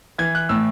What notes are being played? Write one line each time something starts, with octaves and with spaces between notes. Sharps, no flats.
E3 G#6
F#6
A2 E6